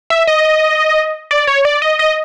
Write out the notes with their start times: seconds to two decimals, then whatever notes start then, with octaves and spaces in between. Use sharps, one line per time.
0.10 E5
0.27 D#5
1.31 D5
1.47 C#5
1.65 D5
1.82 D#5
1.99 D#5